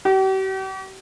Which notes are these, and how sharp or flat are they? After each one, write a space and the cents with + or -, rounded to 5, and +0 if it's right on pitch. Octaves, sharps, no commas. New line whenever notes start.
G4 -45